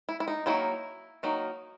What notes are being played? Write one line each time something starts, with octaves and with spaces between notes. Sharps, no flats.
E4
E4
D#4
D#3 F#3 A#3 D#4 E4
D#3 F#3 A#3 D#4